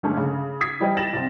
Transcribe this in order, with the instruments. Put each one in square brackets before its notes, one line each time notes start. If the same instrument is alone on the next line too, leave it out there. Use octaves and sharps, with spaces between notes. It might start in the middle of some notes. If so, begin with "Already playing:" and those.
[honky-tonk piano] G1 G#3 A3 C#4 A4
C#3
D#6 G#6 B6
E3 G3 E4 G4 C5 D#5
G5 A6 A#6 E7 F#7
C2 C4